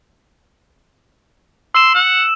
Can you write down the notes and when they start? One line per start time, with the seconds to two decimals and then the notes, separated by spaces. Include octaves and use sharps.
1.75 C6 E6 E7
1.95 F#5